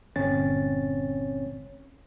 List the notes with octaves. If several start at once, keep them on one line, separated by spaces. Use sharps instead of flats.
G1 A#2 C4 C#4 C#5 A6